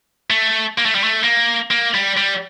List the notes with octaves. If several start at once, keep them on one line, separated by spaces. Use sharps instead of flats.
A3
A#3
A3
G3
A3
A#3
A#3
G3
G3